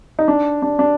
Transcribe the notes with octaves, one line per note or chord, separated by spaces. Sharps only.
D#4
D4
D4
D4